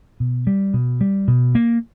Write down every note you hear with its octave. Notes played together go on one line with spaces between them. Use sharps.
B2
G3
B2
G3
B2
A#3